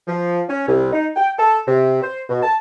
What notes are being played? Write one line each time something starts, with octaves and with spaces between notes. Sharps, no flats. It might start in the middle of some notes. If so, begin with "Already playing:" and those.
F3
C#4
C2
D#4
G5
A4
C3
C5
B2
A5